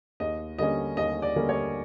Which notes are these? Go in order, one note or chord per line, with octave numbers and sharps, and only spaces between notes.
D#2 D#5
D3 G3 A#3 C#4 D#5
D#2 D#5
D5
D3 G3 A#3 C#4
C#5